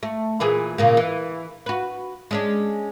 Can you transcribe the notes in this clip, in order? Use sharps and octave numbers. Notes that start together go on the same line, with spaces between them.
A3
A#2 E3 G#4
A#2 C#3 A#3
E3
F#4 B4
G#3 C#4 D4